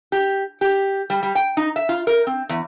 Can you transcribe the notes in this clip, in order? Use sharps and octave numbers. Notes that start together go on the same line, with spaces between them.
G4
G4
G3
G3
G5
D#4
E5
F4
A#4
C4
E2